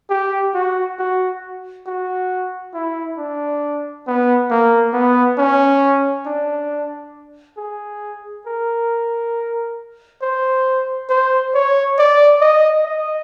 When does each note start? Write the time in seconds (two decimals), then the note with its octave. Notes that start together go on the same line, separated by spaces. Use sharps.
0.10 G4
0.54 F#4
0.99 F#4
1.86 F#4
2.74 E4
3.18 D4
4.07 B3
4.51 A#3
4.94 B3
5.38 C#4
6.26 D4
7.57 G#4
8.47 A#4
10.22 C5
11.09 C5
11.54 C#5
11.98 D5
12.41 D#5
12.85 D#5